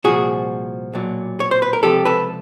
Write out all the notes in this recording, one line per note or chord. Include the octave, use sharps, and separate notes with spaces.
C2 A#2 F3 F#4 G#4
B1 A#2 F#3
C#5
C5
B4
A#4
C#2 C3 F3 G4 A4
A4 B4